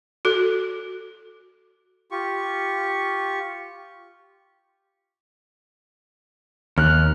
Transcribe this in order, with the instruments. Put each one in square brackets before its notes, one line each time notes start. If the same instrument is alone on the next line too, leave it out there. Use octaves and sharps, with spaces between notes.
[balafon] F#4 A4
[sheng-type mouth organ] F4 G4 C#6
[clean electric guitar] D#2 [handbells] F6 F#6